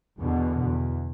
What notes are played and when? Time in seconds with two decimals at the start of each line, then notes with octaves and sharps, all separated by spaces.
0.21 E2 B2 D3
0.65 E2